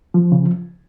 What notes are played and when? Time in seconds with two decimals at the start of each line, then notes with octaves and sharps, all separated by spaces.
0.14 F3
0.32 C#3